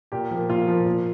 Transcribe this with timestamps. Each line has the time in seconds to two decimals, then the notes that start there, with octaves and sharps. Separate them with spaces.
0.12 A#2 G4
0.31 F3 A#3
0.50 A#2 F4
0.68 F3 A#3
0.86 A#2